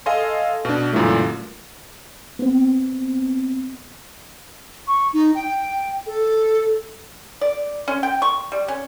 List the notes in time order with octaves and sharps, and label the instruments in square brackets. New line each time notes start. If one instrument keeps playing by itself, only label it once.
[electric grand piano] A4 D#5 F5 G#5 C6
B2 D4
F#2 A#2 D3 E3 G3 A3
[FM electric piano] B3 C4
[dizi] C#6
D#4
G5
A4
[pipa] D5
C#4
G5
C#6
G3
C#4